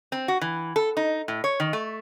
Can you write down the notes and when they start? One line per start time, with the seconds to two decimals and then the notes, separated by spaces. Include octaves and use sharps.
0.12 C4
0.28 F#4
0.41 E3
0.76 A4
0.97 D#4
1.28 A2
1.44 C#5
1.60 D#3
1.73 A3